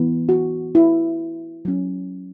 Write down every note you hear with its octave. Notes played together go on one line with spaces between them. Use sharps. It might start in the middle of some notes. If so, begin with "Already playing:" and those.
Already playing: E3 B3
F#4
E4
F#3 C#4